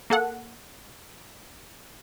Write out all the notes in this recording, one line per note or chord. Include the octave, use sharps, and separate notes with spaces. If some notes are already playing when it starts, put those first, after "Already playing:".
A#3 A4 F#5